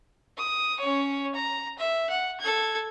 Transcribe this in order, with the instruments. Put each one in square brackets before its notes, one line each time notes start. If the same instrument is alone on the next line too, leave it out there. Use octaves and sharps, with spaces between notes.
[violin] D#6
C#4 C#5
A#5
E5
F#5
A4 G#6